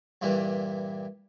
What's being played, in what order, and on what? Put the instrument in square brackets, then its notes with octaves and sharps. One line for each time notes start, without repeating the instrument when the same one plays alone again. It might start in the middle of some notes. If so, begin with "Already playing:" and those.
[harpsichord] G2 A#2 E3 G3